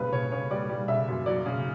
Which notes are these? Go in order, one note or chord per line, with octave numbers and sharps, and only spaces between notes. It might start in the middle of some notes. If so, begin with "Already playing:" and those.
Already playing: C#3 G3 B4
C#3 C#5
C#3 C#5
G3 D5
G3
C#3 E5
F#2
F#3 D5
C#3